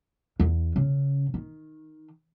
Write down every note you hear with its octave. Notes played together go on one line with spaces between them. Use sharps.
E2
C#3
D#3